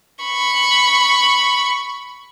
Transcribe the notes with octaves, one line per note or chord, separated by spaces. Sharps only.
B5 C#6